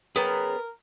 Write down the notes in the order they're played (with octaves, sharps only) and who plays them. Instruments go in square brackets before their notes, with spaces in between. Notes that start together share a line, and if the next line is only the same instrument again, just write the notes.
[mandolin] B3 [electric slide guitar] G#4 C#5 G5 [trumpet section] A#4